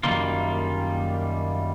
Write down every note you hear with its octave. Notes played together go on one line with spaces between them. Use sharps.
F#2 D3 D#3 G3 A#3 F4